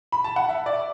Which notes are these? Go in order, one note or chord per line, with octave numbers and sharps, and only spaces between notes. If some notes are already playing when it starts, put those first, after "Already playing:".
B5
A5
F#5
E5
D5